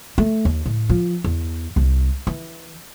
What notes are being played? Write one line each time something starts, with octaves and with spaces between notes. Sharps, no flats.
A3
D#2
A2
F3
E2
C2
E3